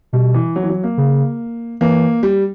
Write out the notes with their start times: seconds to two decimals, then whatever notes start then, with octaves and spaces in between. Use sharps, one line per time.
0.13 B2 G3
0.34 E3
0.56 F#3
0.63 E3
0.70 F#3
0.84 A#3
0.98 C#3
1.81 E3 A#3
2.23 G3